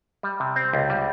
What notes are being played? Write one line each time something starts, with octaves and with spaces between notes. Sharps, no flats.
G3
C3
C4
C#2
G3